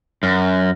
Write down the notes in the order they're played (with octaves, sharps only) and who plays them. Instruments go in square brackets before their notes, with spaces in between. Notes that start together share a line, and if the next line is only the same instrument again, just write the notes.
[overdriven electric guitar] F#2